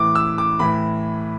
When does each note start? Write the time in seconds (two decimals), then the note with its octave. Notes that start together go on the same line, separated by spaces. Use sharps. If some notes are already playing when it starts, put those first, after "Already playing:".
Already playing: A2 E3 D6
0.15 E6
0.38 D6
0.59 A2 E3 B5